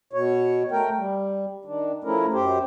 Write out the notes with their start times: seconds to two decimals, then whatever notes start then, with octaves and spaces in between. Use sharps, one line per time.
0.13 B2 C#5
0.71 A3 A#4 G5
0.97 G3
1.65 D#3 D4
2.04 F3 A3 C#4 E4 A#4
2.33 F#2 G4 C5